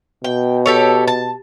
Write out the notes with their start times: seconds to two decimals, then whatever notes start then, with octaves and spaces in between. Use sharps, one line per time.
0.24 B2 G5
0.66 G4 A4 C#5
1.08 A5